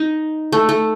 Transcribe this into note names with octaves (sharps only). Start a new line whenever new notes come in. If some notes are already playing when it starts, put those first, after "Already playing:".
Already playing: D#4
A3
A3